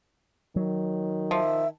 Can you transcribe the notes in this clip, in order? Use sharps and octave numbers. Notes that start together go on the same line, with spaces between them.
D#3 F#3
F3 E5